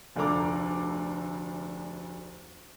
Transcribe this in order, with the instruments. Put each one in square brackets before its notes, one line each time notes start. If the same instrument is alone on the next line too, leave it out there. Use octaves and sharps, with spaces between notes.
[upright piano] F1 D2 D4 A4 A#5 D6